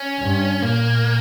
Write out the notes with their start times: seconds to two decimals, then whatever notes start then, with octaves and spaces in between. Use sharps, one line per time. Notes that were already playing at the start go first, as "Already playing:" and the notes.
Already playing: C#4
0.20 G2
0.62 A#2 A#3